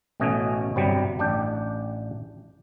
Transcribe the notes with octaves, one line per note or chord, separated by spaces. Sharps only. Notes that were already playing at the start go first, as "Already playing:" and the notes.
A1 B2 A3 C#4 D#5 G#5
G1 C3 F#3 G3
A1 D4 G5